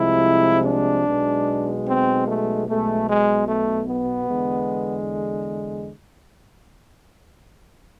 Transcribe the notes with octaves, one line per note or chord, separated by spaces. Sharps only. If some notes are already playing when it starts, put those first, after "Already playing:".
Already playing: C2 C3 F3 G#3 E4
D4
B1 B2 G#3
C4
A3
B1 B2 G#3 A3
G#3
A3
B3
E2 D3 G#3